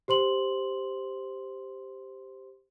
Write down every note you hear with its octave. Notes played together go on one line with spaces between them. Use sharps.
G4 C5 C6 F#7